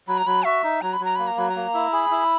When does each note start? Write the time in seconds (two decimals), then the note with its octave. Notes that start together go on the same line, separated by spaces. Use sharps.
0.08 F#3 B5
0.18 A#5
0.26 F#3 B5
0.45 F#4 E5
0.64 D#4
0.81 F#3 A#5
0.93 B5
1.00 F#3 A#5
1.16 A#3 B5
1.27 A#5
1.37 F#3 B5
1.49 A#5
1.56 A#3
1.74 E4
1.93 G#4 B5
2.11 E4